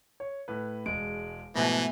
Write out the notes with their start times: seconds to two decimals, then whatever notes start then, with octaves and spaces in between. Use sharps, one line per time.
0.20 C#5
0.48 A2 B4
0.86 E1 G#3 D7
1.55 G#2 B2 E3 F3 A3 B3 G#5